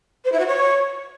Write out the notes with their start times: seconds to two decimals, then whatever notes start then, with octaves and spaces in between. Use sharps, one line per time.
0.24 C5
0.32 E4
0.39 F#4
0.46 C#5